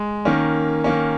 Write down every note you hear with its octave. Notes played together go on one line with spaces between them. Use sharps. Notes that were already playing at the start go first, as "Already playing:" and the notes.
Already playing: G#3
D#3 A#3 C#4
D#3 A#3 C#4